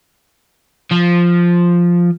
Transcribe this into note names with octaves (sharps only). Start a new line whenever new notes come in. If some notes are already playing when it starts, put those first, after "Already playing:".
F3